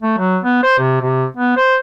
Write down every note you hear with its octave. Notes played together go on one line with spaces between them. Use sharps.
A3
F#3
B3
C5
C3
C3
B3
C5